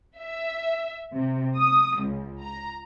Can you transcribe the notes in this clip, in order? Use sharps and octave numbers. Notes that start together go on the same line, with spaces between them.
E5
C3
D#6
C#2
A#5